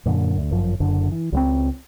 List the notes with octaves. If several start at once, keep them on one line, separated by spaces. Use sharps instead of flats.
F#2 A#2 D3
D2
G1 F#2 F3
F#1 F#2 D3
E3
C#2 F#3 C4